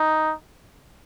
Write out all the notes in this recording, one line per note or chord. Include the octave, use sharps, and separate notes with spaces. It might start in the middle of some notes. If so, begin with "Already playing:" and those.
Already playing: D#4